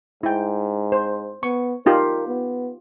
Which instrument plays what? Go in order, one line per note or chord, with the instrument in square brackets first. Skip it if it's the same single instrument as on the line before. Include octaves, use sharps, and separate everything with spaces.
[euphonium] G#2 [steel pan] E4 G5
[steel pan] C5
[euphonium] B3 [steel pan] C#6
[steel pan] D#4 F4 G4 [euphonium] A#4
[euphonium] B3